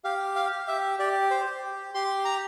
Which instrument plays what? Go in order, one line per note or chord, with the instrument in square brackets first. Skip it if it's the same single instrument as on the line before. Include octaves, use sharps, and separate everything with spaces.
[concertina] G4 F5
F5
G4
E5
G4 D5
C5
G4
G4 C6
A#5